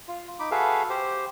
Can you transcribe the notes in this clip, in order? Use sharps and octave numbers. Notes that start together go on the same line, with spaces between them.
F4
D#4 B5 D6
F#4 G#4 A4 B4 E5 F5
G4 C5